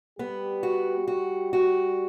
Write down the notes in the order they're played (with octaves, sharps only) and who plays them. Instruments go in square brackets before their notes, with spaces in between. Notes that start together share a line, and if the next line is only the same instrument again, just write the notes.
[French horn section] G3 G4 [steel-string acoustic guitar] B3
[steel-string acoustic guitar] F#4
F#4
F#4